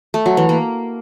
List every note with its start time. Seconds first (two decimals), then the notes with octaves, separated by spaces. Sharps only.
0.14 A3
0.26 F#3
0.37 E3
0.49 A#3